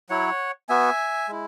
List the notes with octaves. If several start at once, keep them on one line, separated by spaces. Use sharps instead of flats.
F#3 E4 C#5 F#5
B3 F#4 E5 G#5
G#3 E4